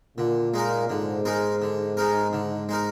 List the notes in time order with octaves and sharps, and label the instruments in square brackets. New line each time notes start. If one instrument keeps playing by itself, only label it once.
[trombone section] A#2 [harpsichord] D3
[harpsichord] G#3 D#4 A#4
[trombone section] G#2 [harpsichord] D3
[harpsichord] G#3 D#4 A#4
D3
G#3 D#4 A#4
D3
G#3 D#4 A#4